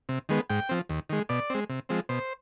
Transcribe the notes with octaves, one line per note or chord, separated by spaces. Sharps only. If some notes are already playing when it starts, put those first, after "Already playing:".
C3
D#3 G#3 B3
G#2 G5
F3 C4
D#2
D#3 G#3
B2 D5
G#3 C4
C3
F3 G#3 C4
B2 C5